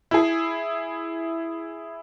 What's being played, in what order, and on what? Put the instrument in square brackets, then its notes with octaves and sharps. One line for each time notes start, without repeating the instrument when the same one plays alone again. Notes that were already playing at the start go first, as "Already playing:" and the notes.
[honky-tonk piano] E4 G#4